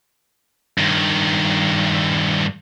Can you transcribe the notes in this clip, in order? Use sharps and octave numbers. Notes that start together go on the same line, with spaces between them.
G2 D#3